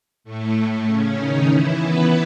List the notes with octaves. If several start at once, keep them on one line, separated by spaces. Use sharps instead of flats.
A2 A3
A2 A3
C#3 C#4
D#3 D#4
E3 E4
B3 B4